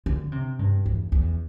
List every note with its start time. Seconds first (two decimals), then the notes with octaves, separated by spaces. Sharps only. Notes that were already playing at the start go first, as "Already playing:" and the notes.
0.06 D3
0.32 C3
0.59 G2
0.86 E2
1.12 E2